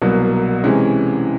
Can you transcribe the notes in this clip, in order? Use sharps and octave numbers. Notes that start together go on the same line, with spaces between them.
C2 B2 F#3 A#3
C3 E3 G#3 C#4